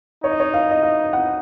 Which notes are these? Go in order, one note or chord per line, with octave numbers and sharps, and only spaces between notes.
D#4 C#5
D#5
C#5
F5
D#5
F5
F#5